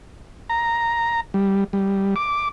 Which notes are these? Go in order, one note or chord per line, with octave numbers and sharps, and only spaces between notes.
A#5
G3
G3
D6